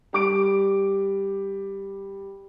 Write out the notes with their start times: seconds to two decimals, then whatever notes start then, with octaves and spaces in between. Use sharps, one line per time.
0.13 G3 D6 D7